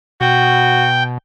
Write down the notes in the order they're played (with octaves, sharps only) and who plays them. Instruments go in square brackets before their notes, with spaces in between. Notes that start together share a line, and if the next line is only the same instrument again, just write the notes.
[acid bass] B2 [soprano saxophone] F#4 [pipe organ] G5